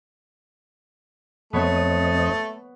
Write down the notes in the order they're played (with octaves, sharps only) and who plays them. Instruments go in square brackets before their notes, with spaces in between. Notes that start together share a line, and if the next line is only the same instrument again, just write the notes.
[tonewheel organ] F2 C4 D#5 [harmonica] A3 [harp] B3 C#5